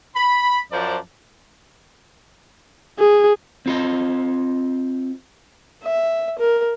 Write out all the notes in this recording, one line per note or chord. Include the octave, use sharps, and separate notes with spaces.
B5
F#2 F3 C5 D5 A5 A#5
G#4
C4 F4 D#5
E5
A#4